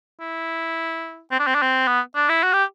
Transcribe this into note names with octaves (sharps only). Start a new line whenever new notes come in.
E4
C4
D4
C4
D4
C4
B3
D4
E4
F#4
G4